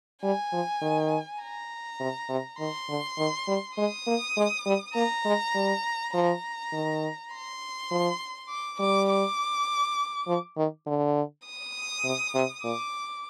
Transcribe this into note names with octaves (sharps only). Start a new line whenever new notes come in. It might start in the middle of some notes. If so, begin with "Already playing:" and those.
G3 G#5
F3
D#3
A#5
C3
C3
D#3 C6
D3
D#3
G3
G#3 D#6
A#3
G#3
G3
A#3 A#5
G#3
G3
F3 A#5
D#3
C6
F3
D6
G3 D6
D6
F3
D#3
D3
D#6
C3
C3
A#2 D6